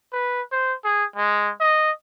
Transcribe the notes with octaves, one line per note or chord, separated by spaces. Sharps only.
B4
C5
G#4
G#3
D#5